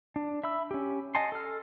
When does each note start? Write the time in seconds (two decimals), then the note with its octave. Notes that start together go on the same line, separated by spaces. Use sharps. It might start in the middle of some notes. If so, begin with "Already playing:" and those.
0.16 D4
0.44 E5 B5 E6
0.71 C#4 G4
1.15 D#5 F#5 G#5 A5 C6
1.32 A4 F6